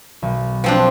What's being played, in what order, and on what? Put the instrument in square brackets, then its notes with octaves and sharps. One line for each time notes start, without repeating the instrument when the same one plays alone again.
[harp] B1
[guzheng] F3 C4 D4